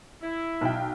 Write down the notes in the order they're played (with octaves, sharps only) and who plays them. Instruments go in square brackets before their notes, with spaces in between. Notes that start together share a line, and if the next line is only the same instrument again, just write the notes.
[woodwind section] E4
[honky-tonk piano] B1 G5